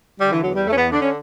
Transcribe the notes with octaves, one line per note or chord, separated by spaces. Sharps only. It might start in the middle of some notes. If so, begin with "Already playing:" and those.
D3 G3
E3
E2 F#3
G3
E2 A3
C#4
B3
D3 D4
C#4